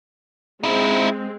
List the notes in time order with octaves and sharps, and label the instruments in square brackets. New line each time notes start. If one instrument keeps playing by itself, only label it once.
[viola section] G#3 C4 [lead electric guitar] D#4 E4